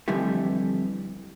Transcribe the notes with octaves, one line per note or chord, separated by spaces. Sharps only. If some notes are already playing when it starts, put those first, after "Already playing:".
F2 D3 E3 G3 A3